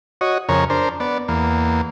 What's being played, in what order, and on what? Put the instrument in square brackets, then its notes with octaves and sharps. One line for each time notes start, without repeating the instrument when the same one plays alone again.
[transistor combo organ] F#4 C#5 D#5
F2 C#3 A#4 C#5
D4 A#4 C5
B3 D5
E2 A#3